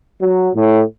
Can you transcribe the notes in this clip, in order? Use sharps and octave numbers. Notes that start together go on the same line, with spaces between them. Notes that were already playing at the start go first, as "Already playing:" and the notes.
F#3
A2